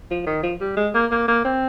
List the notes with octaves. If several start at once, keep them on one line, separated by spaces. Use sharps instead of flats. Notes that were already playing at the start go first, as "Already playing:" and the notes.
F3
D#3
F3
G3
G#3
A#3
A#3
A#3
C4